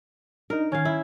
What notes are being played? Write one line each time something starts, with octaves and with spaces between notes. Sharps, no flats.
D4 D#4 A#4
D#3 C#4 F5 G#6
E4